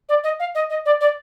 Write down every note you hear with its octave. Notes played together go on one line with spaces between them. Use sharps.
D5
D#5
F5
D#5
D#5
D5
D5